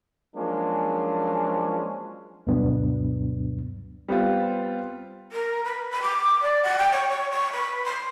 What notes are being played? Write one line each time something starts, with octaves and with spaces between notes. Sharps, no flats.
F3 F#3 G#3 A#3 C#4 D4
D2 G2 B2 F#3 B3 D4
G3 B3 C4 F4
A#4
B4
B4
D6
D5
F#5
G5
C#5
C#5
C#6
B4
C6